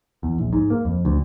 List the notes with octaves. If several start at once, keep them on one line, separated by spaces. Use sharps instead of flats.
E2
A#1
G#2
A#3
F2
D2